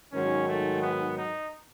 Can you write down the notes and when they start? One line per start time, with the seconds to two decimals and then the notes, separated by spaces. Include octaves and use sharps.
0.12 G#2 D#3 F#3 C#4
0.48 A3
0.82 B3
1.17 D#4